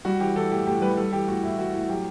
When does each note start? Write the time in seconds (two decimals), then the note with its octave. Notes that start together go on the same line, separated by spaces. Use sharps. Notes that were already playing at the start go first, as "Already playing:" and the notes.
0.05 G3 F#4
0.20 E3 G4
0.36 E3 A4
0.51 A2 G4
0.67 A2 G4
0.82 G3 B4
0.97 G3 A4
1.13 E3 G4
1.28 A2 F#4
1.43 A2 E4
1.58 E3 F#4
1.74 A2 E4
1.89 F#3 G4